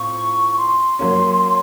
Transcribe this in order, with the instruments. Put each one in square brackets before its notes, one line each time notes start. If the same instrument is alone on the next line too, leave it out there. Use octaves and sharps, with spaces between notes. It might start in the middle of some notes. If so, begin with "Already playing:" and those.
Already playing: [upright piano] A2 C4 F4 [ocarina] C#6
[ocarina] C6
[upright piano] F#3 A#3 C#4